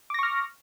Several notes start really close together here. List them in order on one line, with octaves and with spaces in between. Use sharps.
D6 A#6 C#6 F6